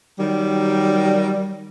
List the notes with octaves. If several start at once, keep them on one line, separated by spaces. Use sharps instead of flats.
D#3 F#3 G3